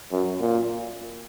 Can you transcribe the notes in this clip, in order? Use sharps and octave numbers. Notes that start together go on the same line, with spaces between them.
F#2
A#2